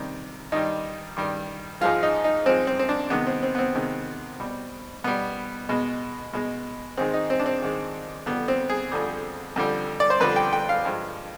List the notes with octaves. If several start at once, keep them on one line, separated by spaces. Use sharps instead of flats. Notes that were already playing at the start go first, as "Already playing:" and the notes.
Already playing: C3 D#3 G3
G2 D#3 G3 D#4
G2 D#3 G3
G#2 F3 G#3 F4
D#4
D#4
G#2 F3 G#3 C4
C4
C4
D4
C3 D#3 G#3 B3
C4
C4
B3
C4
C3 D#3 G#3
B2 G3
B2 G3 B3
B2 G#3
B2 G#3
G#2 D#3 G#3 C4
D#4
C4
D4
C4
G#2 D#3 G#3
F2 D3 G3 B3
C4
G#4
F2 D3 G3
F2 D3 G3
D5
C5
F2 D3 G3 B4
G5
G5
F5
G2 F3 G#3